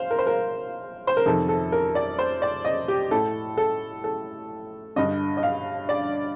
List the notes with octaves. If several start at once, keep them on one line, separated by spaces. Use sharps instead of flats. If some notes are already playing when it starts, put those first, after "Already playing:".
Already playing: C5 F5
A#4
C5
A#4
C5
A#4
F2 C3 D#3 A4
A4
A#4
D5
C5
D5
D#5
G4
A2 A4
A4
A4
G2 D3 D#5
D#5
F5
D5